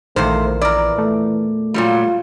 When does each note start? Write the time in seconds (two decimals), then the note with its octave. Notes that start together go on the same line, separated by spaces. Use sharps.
0.16 A#1 E2 A#2 D#3 A3 C5
0.61 E3 E4 A#4 D5
0.98 A3
1.74 A#2 F#3 G3 F4